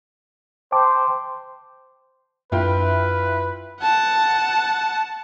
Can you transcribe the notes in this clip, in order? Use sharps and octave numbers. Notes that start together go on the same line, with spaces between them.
C5 G5 A5 D6
F#2 A#3 D4 E4 F4 B4 G5
F#5 A5